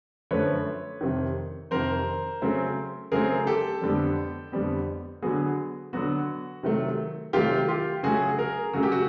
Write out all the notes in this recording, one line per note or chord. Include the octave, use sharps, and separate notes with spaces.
F#2 D3 F3 A3 B4 C#5
F2 C3 D#3
F2 C3 D#3 A#4 C5
C#3 F#3 A3 C4
C#3 F#3 A3 C4 G#4 A#4
G4 A4
F2 D3 G3 B3
F2 D3 G3 B3
D3 F#3 B3 F#4 G#4
D3 F#3 B3 F#4
C3 D#3 F#3 A3
C3 D#3 F#3 A3 F4 G4
F4 G4
C#3 F#3 A3 C#4 F#4 G#4
G#4 A#4
C#3 F#3 A3 C#4 F#4
G4
F#4